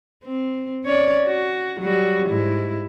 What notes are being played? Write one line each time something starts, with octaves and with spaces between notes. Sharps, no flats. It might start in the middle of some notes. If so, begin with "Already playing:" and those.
C4
C#4 C#5 D5
F#4
F#3 G3 F#4
G#2 E4